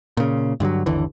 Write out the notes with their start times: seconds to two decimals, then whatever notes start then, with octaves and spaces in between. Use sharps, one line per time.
0.17 A#2 C#3
0.60 G2 D3 F3 F#3
0.86 G1 D#2 D3 E3